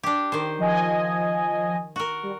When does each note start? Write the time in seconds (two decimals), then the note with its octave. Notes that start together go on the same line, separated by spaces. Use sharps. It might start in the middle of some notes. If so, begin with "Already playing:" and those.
0.03 D4 G4
0.32 D#3 C5
0.59 F3 D#5 G#5
1.96 F#4 A#4
2.23 G3